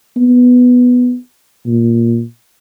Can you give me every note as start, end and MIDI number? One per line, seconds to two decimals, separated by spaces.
0.17 1.16 59
1.66 2.23 46